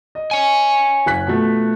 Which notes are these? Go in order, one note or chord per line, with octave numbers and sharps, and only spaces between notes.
D#5
C#5 G#5
F#1 F#6 B6
B2 F3 A3